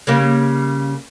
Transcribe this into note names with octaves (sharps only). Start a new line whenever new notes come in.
C#3 G3 A#3